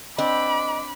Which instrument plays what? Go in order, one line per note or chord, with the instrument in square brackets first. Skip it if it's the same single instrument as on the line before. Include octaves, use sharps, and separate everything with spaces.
[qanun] C4 D4 [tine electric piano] D#5 [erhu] B5 [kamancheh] D6